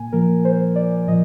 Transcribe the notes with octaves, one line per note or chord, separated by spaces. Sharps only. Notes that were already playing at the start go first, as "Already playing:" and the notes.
Already playing: A#2 A#3 G#5
A#2 F3 A#3 A#4
C5
D5
A#2 F3 D#5